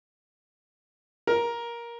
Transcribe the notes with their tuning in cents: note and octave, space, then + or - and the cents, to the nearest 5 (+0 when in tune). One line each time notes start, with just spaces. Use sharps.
A#4 +10